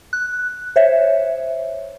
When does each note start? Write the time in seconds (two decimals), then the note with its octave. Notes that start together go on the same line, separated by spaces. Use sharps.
0.13 F#6
0.76 C5 C#5 E5